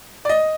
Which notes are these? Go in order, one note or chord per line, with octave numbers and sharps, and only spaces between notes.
D5
D#5